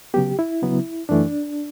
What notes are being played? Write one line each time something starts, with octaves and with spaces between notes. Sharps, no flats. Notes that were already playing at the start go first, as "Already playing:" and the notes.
C#3 F#3 B3 G4
E4
C#3 F#3 B3
F#2 E3 A3 D4